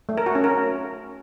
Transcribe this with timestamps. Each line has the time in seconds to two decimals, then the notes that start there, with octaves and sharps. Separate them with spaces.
0.09 A3
0.18 A#4
0.26 F#4
0.35 C#4
0.44 A#4